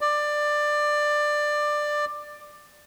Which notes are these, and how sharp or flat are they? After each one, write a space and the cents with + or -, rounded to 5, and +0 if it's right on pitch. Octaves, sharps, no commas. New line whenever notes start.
D5 +15